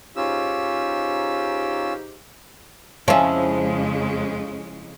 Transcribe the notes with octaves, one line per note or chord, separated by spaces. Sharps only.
G#2 C#4 D#4 F4 G4 E6
F2 C#3 F3 G#3 C#4 E4